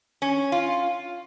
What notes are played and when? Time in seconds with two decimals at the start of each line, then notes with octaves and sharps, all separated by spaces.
0.22 C#4
0.52 F4